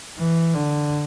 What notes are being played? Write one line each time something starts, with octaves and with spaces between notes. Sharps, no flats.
E3
D3